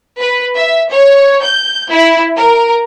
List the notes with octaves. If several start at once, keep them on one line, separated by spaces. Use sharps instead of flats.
B4
E5
C#5
G6
E4
A#4